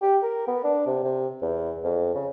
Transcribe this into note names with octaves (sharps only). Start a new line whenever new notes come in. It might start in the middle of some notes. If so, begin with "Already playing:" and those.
G4
A#4
B3
D4
C3
C3
E2
F2
C#3